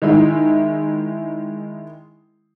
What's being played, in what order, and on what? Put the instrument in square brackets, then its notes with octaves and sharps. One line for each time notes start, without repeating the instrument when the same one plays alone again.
[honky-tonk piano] D#3 G#3 E4